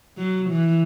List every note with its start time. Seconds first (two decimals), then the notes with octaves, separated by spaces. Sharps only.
0.18 F#3
0.50 E3